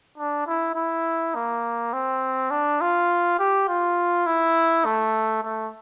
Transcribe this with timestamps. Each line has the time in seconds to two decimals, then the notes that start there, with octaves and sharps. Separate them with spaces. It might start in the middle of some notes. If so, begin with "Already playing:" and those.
0.18 D4
0.47 E4
0.75 E4
1.35 A#3
1.93 C4
2.51 D4
2.81 F4
3.39 G4
3.69 F4
4.26 E4
4.85 A3
5.43 A3